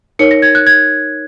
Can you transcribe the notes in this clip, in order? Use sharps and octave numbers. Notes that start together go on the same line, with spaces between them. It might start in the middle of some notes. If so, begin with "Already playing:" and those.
D#4 A#4 C#5 C#7
A#6
G#6
F#6
G#6